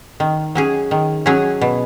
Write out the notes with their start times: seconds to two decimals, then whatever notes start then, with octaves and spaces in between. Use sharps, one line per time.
0.20 D#3
0.55 F#3 C#4 G#4
0.91 D#3
1.26 F#3 C#4 G#4
1.61 B2